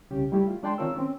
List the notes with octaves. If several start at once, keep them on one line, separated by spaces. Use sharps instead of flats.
C2 C#3 C#4 G4
G3 A3 E4 G4
F4
G#3 D4 D5 G5 A5 C6
D#3 C4 F4 A#4 C#5 E6
C4 C#4